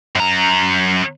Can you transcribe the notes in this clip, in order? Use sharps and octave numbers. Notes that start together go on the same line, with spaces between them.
F#2 A#5